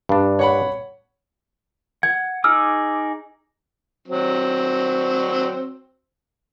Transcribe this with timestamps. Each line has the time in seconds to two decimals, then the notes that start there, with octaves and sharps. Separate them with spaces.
0.09 G2 D4
0.39 C#5 F#5 B5
2.03 F#5 G#6
2.44 D#4 G#4 D6 E6 F6
4.08 F#3 C4